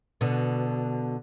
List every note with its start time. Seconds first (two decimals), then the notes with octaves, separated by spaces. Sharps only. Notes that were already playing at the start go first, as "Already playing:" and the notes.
0.21 B2 D3